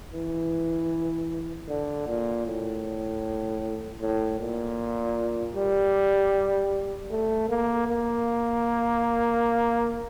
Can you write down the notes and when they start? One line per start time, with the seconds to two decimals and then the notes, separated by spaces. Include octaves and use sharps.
0.13 E3
1.68 D3
2.07 A#2
2.46 A2
4.01 A2
4.39 A#2
5.55 G3
7.10 A3
7.49 A#3
7.88 A#3